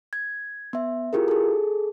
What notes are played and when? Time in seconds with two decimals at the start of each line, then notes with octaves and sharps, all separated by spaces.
0.13 G#6
0.73 B3 E5
1.13 E4 F4 G4 G#4 A#4
1.28 G#4 A4